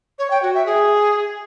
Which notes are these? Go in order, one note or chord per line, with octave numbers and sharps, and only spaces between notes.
C#5
G5
F#4
E5
G#4